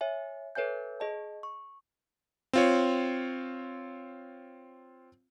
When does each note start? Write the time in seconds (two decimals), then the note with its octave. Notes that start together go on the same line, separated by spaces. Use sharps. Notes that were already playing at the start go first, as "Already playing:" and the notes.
0.01 C#5 E5 G#5
0.55 A4 B4 C#5 E5 G#5 G6
1.00 G#4 D#5 A5
1.43 C#6
2.53 C4 F4 C#5